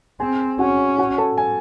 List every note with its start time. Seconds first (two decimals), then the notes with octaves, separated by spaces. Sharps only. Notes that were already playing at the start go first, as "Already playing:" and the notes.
0.20 C4 G#4 G#5
0.59 C#4 F#4 F#5
0.98 F#4 F#5
1.18 A4 A5
1.38 G#5